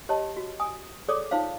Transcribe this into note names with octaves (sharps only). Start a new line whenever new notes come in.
G4 C#5 D#5 A5
F#4
G#5 D#6
G#4 A4 C#5 D5 D6 D#6
D#4 F4 C5 C#5 F5